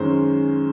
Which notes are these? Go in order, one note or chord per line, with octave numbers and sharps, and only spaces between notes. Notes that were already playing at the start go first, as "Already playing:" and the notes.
Already playing: F#2 D#3 G#3 C#4 C5